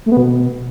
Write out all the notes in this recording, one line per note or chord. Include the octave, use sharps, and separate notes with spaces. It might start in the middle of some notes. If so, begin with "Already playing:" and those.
A3
B3
B2